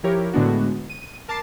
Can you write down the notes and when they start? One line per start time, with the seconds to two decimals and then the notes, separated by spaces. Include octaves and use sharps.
0.03 F3 E4 G4 A#4 C#5
0.33 A2 D3 G#3 B3 D4 F#4
0.90 D#7
1.28 A#4 A5 D6 A6 C7